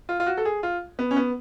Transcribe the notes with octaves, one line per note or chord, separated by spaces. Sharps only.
F4
F4
F#4
A4
G#4
F4
B3
C#4
B3